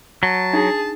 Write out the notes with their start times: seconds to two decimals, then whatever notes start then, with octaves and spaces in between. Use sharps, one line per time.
0.23 F#3 A5
0.53 D4 D#4 G#4